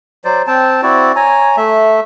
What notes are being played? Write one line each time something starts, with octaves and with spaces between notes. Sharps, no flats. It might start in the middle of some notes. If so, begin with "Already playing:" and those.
F#3 C5 D5
C4 G5 A5
C4 E4 F#4 D5
C#5 G#5 A#5
A3 E5